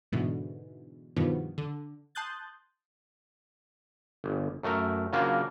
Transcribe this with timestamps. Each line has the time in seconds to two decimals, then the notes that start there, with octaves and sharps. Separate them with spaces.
0.12 G#2 B2 D3 E3
1.16 G2 B2 D#3 F3 B3
1.58 D3
2.15 A5 C6 D#6 F#6 G6 A6
4.24 G1
4.63 F#2 A3 A#4
5.13 C#3 F#3 A#3 D4 F4 A#4